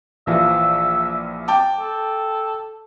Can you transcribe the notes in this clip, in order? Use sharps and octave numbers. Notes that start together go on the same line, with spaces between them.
A#1 E3 F3 E5
G5 A5 D6
A4